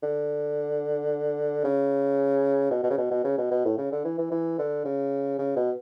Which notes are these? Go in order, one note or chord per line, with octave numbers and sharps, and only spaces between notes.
D3
C#3
B2
B2
C#3
B2
B2
C#3
B2
B2
A2
C#3
D3
E3
E3
E3
D3
C#3
C#3
B2